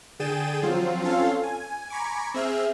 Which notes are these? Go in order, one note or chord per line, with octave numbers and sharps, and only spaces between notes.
D3 G#4 G5 A6 D#7 E7
F3 F#3 C4 F4
C4 C#4 F4 A4 F5
G#5
G#5 A#5 B5 C#6 D6
C4 G#4 E5 F6